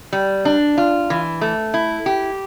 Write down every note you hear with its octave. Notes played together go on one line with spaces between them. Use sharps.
G3
D4
F4
E3
A3
E4
G4